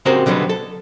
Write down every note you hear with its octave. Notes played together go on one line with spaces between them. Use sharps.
C#3 C4 F#4 G4 A#4 C5
B2 D3 F#3 G3 B3
A4